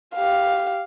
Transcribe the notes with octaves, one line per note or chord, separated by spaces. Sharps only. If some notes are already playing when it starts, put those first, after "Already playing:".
G4 F5